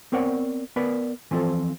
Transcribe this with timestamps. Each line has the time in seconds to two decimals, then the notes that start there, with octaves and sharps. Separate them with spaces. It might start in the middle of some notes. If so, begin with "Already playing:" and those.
0.12 B3 C4 A#4 C#5 D5 F#5
0.76 B3 A#4 B4 D5
1.31 E3 F3 C4 F4 A4